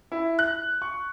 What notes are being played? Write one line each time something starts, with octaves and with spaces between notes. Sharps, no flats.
E4
F#6
C#6